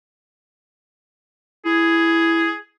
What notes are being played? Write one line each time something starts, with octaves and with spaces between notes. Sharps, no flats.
E4 G#4